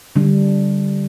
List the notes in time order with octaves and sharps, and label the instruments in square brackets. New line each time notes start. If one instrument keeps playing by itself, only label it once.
[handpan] D3 G3 D4